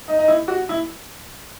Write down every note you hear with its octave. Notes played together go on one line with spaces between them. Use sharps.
D#4
D#4
E4
F#4
E4